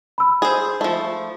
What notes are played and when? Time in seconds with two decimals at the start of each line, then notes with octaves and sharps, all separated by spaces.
0.18 B5 E6
0.42 G#4 C5
0.81 F3 A3